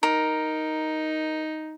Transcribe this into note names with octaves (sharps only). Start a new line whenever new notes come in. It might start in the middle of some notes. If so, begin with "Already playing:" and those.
D#4 A#4